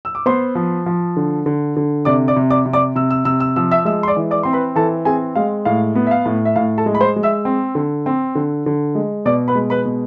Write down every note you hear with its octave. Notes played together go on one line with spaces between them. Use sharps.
E6
D6
B3 C5 C6
F3
F3
D3
D3
D3
C3 D5 D6
D5 D6
C3
D5 D6
C3
D5 D6
C3 E6
E6
C3 E6
E6
F3 E6
E5 E6
G#3 E5 E6
C6
D5 D6
E3
D5 D6
C4 C6
B4 B5
E3 A4 A5
C4 G#4 G#5
G#3 F5
A2 F5
B3
E5
F5
A2
E5
A2 F5
A4 A5
G#3
B5
C5 C6
G#3
E5 E6
C4
D3
C4
D3
D3
G#3
B2 D5 D6
B4 B5
G#3
B4 B5
B2